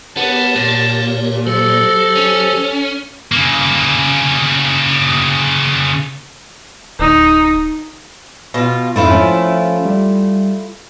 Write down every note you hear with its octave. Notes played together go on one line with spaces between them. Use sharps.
B3 G4 A#4 C#5 A5
A#2
F#3 G4 A4 C5
C#4
C#3 A#3
D1 D#4
B2 F4
F2 G#2 A3 E4 F4
F3 C#4
G3